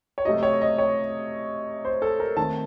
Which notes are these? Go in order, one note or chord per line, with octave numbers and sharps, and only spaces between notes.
C#5
C3 F#3 A3 C4 D#5
C#5
D#5
C#5
C5
A4
A#4
D#3 A3 C4 A5